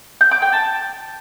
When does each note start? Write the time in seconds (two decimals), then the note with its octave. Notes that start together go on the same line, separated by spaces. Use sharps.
0.21 G6
0.31 D6
0.42 G5
0.53 A5